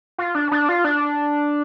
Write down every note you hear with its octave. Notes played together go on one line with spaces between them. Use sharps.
F4
D4
D4
F4
D4